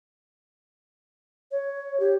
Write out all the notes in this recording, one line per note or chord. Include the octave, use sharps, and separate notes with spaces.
C#5
G4